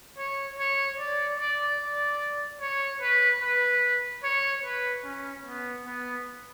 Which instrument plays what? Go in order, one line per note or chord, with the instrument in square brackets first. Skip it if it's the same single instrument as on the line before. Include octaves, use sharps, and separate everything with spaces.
[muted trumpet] C#5
C#5
D5
D5
D5
C#5
B4
B4
C#5
B4
C#4
B3
B3